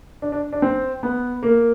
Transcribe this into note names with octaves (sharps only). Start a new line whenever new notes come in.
D4
D4
D4
C4
B3
A#3